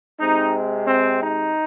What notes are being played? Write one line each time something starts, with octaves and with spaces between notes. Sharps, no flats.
C3 G#3 C4 D#4
C4
D#4